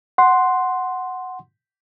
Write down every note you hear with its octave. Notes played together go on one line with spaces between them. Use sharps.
F#5 C6